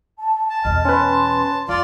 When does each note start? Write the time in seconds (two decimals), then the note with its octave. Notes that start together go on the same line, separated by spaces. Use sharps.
0.19 A5
0.50 G#5 A5
0.65 E2 B2 D#5 F6
0.85 C#4 B4 C6
1.69 F2 F4 D5